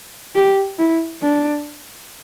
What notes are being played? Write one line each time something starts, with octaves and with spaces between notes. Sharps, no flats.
G4
E4
D4